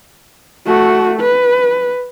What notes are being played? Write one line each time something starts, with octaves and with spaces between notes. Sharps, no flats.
A3 F#4
B4